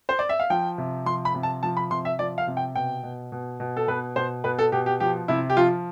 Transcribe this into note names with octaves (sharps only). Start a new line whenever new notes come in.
C5
D5
E5
F5
F3 G5
C3
F3 C6
B5
C3
A5
F3 A5
B5
C3 C6
E5
F3 D5
F5
C3
G5
B2 G5
B2
B2
B2
A4
B2 B4
B2 C5
B2 B4
A4
B2 G4
G4
F3 G4
C3 E4
G4
F3 F4